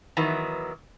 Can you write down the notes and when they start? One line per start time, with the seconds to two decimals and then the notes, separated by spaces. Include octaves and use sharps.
0.17 D#3 E3 F#3 B3